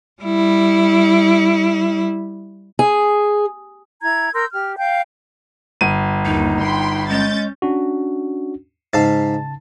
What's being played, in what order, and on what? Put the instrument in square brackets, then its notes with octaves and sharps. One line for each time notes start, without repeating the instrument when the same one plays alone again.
[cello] G3 E4
[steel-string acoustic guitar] G#4
[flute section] E4 A#5 G#6
A#4 C6 E6 G6
G4 F6
F5 G5 G6
[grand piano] G1 D#7
[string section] D#2 [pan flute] D#4
[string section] G5 B5 C6
[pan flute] G#3 [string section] C#4 G6 A6
[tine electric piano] C#4 D4 F#4
[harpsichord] G#2 F5 [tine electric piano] C#3 A5 A6